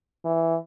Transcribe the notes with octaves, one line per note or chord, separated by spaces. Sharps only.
E3